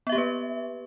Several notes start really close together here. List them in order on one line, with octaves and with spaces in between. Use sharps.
B3 E5 G4 A#3 B4